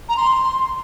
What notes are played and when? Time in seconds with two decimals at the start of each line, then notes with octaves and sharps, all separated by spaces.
0.09 A#5
0.17 C6